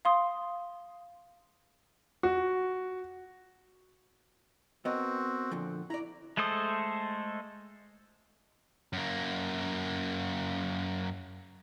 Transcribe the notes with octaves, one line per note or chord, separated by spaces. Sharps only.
F5 C6 D#6
F#4
B3 C4 F#4 A#4 D#5
A#2 D3 F3
E4 D5 A#5
G#3 A3 A4 C5 D#6
F#2 A#3